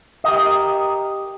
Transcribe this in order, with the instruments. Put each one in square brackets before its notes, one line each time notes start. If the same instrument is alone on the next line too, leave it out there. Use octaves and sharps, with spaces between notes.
[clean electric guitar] G4 A#4 D#5